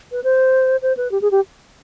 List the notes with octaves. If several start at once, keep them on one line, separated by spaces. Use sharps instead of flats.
B4
C5
C5
B4
G4
G#4
G4